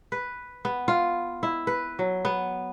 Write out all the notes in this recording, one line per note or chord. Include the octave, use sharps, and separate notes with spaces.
B4
B3
F4
E4
B4
F#3
B3